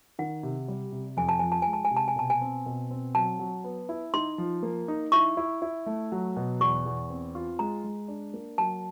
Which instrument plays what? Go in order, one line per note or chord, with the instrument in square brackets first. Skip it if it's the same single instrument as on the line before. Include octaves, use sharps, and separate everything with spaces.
[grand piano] D#3 [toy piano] F#5
[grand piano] C3
G3
C3
[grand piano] F2 [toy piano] G#5
[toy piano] A5
[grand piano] F3 [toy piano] G#5
[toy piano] A5
[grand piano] G#3 [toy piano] G#5
[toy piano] A5
G#5
[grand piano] C3
[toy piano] A5
G#5
[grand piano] B2 [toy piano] A5
[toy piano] G#5
[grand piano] C4
B2
C4
[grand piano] F#3 [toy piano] A5
[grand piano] F#3
B3
E4
[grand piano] D#4 [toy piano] C6
[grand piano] F3
A#3
D#4
[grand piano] E4 [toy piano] C#6
[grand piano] E4
E4
A3
F#3
B2
[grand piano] E2 [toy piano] C#6
[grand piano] E2
C4
F4
[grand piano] G#3 [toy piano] A#5
[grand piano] G#3
D4
A#3
[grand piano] F#3 [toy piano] A5